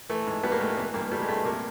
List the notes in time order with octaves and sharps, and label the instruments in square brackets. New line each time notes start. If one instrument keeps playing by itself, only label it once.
[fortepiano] E3 A3
G#2
G3 B3
A#3
G#2 A3
A#3
E3 B3
G2 A#3
G3 A3
G#3
G2 A3
C3 A#3